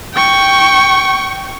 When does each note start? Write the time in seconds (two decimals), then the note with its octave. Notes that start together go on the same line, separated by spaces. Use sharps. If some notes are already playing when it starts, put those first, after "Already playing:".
0.14 G5 C#6